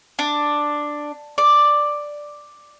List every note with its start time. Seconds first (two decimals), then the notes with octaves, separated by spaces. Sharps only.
0.19 D4
1.38 D5